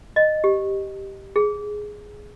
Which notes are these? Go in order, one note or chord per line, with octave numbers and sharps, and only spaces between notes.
D#5
G4
G#4